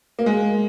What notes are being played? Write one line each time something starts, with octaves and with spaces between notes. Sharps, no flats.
A#3
G#3